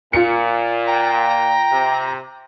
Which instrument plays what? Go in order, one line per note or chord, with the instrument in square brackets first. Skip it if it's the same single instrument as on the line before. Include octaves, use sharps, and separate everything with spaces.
[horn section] A#2 [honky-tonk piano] F4 C#7
[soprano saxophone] G5 [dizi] A#5
[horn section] C3